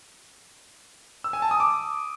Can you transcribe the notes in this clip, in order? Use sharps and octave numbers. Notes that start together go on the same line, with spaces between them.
E6
G#5
A5
D#6
D6